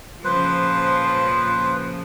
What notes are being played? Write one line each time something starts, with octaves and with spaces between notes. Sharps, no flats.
A#2 C#3 F3 B4 C5